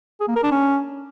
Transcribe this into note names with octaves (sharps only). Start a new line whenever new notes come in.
G#4
A#3
A#4
D4
C#4